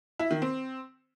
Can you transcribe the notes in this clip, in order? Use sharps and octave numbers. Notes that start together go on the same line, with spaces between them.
E4
D#3
C4